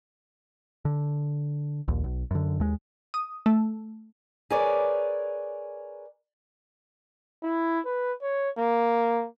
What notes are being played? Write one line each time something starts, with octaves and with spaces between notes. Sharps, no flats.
D3
A#1 D#2
B1
F#2 D3
D#2 G#3
D#6
A3
G#4 A#4 B4 C#5 D5
E4
B4
C#5
A#3